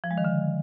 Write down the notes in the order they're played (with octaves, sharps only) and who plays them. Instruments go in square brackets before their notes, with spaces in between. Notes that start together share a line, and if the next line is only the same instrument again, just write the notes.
[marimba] F3
G#3
D#3
D3